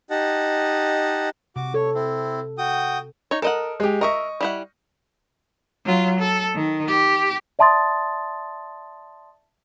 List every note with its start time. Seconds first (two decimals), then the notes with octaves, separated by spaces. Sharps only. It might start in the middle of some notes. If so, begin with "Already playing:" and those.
0.10 D#4 G4 D#5 F#5 A5
1.56 C3 F#4 D6
1.74 A4 C#5
1.95 C4 E4
2.58 F#4 G5 D#6
3.31 D#4 C#5
3.42 A4 A#4 D#5 F#5
3.80 G#3 G4
4.01 A#4 D#5 E5 C#6
4.41 G3 E4 F#5
5.85 F#3 F4
6.20 A4
6.55 D#3
6.88 G4
7.59 D5 E5 A5 C6 D#6 A6